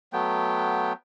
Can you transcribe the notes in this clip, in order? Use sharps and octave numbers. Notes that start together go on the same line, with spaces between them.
F#3 A3 B3 G5